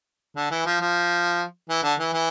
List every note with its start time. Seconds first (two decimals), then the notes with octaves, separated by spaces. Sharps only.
0.36 D3
0.51 E3
0.66 F3
0.81 F3
1.69 E3
1.83 D3
1.99 E3
2.14 E3